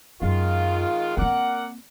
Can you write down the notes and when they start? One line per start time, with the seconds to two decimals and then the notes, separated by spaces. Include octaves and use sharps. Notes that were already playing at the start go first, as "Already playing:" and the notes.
0.22 F#2 D#3 F#3 G#3 F4
1.17 A#3 C4 A#4 D5 F#5